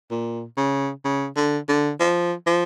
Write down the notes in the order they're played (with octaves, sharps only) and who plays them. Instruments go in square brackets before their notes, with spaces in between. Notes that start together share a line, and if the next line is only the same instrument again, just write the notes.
[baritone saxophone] A#2
C#3
C#3
D3
D3
F3
F3